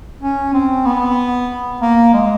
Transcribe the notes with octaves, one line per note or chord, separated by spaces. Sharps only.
C#4
C4
B3
A#3
G#3